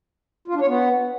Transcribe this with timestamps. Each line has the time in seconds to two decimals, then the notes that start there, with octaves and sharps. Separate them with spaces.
0.48 F4
0.55 D4
0.61 C#5
0.68 B3